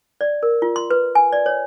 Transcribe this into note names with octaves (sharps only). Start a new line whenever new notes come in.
D5
A#4
F4
C6
B4
G#5
D5
C#5